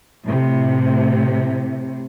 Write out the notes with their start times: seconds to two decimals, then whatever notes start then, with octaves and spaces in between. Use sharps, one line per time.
0.24 A2 C3